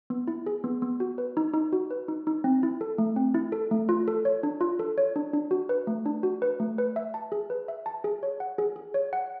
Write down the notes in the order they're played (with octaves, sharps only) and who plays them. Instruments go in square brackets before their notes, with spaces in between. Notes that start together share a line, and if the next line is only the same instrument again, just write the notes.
[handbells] B3
E4
G#4
B3
B3
F#4
B4
D#4
D#4
F#4
B4
D#4
D#4
C4
E4
A4
A3
C4
E4
A4
A3
F4
A4
C#5
D4
F4
A4
C#5
D4
D4
F#4
B4
A3
D4
F#4
B4
A3
B4
E5
A5
G#4
B4
E5
A5
G#4
C#5
F#5
G#4
G#4
C#5
F#5